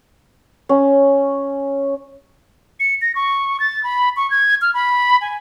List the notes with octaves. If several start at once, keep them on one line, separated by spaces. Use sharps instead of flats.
C#4
C#7
A#6
C#6
A6
B5
C#6
G#6
F6
B5
G#5